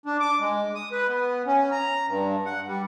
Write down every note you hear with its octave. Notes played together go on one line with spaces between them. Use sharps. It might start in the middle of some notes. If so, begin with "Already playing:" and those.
D4
D6
G#3
D#6
B4
B3
C#4
A#5
G2
F#5
G3